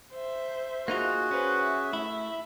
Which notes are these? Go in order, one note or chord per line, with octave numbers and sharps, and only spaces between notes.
C5 E5
A#3 D#4 F4 F#4 G#4
C#4 B4 C5
E5
A3 E4